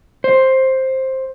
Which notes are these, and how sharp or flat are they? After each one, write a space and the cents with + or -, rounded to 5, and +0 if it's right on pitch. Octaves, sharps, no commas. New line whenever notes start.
C5 +10